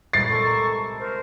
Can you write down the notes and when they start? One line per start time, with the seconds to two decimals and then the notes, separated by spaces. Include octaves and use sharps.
0.13 C2 A#2 G#3 A6 C7
0.28 A4 C#6
0.45 A5 A#5 D6
0.99 A#4 C5